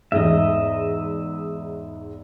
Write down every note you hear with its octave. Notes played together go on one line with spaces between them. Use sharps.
E2 G#2 D#5 E5